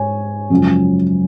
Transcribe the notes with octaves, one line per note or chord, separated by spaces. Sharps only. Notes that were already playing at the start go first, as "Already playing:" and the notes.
Already playing: G#2 G#3 C#5 G#5
F#2 C#3 F3 G#3